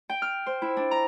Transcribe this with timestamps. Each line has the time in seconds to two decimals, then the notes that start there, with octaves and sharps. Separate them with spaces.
0.10 G5
0.22 F6
0.46 C5
0.62 E4
0.77 D4
0.91 A#5